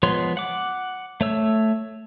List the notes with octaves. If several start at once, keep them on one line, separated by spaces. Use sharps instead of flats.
F3 G#3 B3 C#5 C6
F#5 D6
A3 C#5 E6